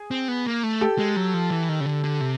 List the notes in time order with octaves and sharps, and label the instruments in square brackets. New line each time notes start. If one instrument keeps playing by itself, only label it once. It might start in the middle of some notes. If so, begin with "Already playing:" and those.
Already playing: [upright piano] G#4
[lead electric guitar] C4
B3
A#3
A3
[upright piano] G4 A4
[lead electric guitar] G#3
F#3
F3
E3
D#3
C#3
D3
D3
C3